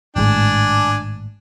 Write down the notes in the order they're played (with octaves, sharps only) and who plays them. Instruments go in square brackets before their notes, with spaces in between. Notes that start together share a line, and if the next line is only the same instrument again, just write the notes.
[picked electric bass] G#1 A2 G#3 [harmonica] D4 G#5